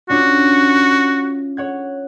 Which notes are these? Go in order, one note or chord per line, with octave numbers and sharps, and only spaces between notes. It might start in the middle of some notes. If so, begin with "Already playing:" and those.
C#4 D4 F4 F#4
C#5 F#5 G#6